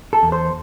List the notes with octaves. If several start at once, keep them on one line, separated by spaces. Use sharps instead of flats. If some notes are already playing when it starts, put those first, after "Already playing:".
A4
E2
C5